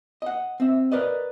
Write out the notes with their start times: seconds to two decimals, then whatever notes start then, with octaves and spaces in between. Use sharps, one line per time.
0.22 D#5 F#5
0.60 C4 E5
0.92 A#4 B4 D5 D#5